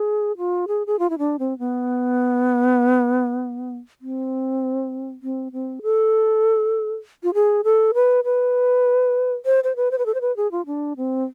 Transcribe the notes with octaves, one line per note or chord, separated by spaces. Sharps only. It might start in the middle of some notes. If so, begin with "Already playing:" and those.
Already playing: G#4
F4
G#4
G#4
F4
E4
D4
C4
B3
C4
C4
C4
A4
F4
G#4
A4
B4
B4
C5
C5
B4
C5
B4
A4
C5
B4
G#4
F4
D4
C4